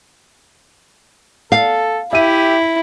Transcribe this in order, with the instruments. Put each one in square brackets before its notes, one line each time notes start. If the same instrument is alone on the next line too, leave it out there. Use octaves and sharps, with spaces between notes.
[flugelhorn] A4 [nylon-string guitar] F5
[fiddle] E4 [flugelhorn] G4 [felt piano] E5 D#7